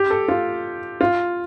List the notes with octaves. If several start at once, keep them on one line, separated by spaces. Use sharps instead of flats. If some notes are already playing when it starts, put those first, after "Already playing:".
Already playing: G4
A4
F4
F4